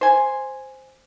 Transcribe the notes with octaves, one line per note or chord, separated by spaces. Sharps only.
C5 G#5